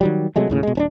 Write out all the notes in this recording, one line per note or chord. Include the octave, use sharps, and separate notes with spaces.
D#3 F#3 G3
C3 F#3 G#3 A3
D#2 A2 C#3
B2 G#3
D#1 C#4 D4